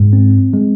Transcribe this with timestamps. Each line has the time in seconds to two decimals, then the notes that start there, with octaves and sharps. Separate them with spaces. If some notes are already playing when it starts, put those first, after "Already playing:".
Already playing: G#2 G#3
0.13 C4
0.54 G#3